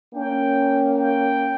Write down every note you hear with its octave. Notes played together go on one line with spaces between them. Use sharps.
A#3 C#4 G5
G5